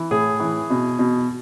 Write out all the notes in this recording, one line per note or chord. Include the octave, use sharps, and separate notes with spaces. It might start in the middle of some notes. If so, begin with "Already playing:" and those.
Already playing: E3
A2 G#4
E3
B2
B2